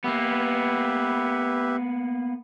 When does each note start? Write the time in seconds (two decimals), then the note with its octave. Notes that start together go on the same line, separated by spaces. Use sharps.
0.04 A#3 B3 G4 B4 E5